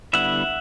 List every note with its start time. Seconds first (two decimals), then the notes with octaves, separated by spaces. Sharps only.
0.13 D3 G3 B3 E4 E5 F#5